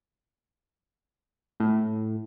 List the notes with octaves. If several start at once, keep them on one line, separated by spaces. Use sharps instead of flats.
A2